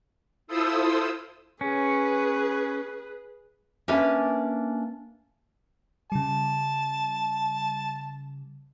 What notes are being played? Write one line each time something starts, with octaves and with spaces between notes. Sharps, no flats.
E4 F4 A4 C5 D#6 E6
C#4 G#4 B4
A#3 C#4 D4 B4 E5 G#5
C#3 G3 A5